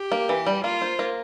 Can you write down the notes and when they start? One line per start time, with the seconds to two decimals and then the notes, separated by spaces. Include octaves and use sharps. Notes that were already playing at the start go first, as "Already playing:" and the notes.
Already playing: G4
0.12 A#3
0.29 E3
0.46 G3
0.64 A#3 F4
0.82 C5
0.99 A#3